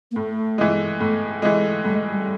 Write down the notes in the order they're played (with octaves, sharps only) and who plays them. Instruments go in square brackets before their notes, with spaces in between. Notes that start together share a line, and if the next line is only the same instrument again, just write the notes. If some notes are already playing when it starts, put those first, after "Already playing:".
[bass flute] A#3
[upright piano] A2 [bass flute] A3
[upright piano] E3 G#3
A2
E3 G#3
[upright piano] A2 [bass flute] G3
[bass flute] G#3
G3